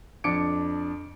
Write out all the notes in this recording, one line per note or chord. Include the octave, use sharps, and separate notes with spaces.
F2 D4 D6 C#7 D7